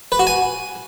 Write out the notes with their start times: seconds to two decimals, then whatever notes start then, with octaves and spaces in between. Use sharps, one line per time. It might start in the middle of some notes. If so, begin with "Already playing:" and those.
0.12 B4
0.19 F#4
0.27 G#5